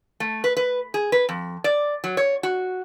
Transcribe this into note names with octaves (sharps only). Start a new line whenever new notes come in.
A3
B4
B4
G#4
B4
F2
D5
F#3
C#5
F#4